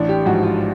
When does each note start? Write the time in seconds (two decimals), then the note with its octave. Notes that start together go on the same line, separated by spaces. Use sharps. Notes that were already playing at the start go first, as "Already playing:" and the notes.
Already playing: A1 D4
0.09 G4
0.26 G#2 F3 F#4
0.43 F4